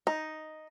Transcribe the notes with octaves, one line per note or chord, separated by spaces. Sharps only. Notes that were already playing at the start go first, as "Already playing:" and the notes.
D#4